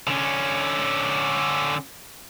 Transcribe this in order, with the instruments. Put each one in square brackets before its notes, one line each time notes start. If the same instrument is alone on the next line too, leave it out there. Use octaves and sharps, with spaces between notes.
[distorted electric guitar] D3 C#4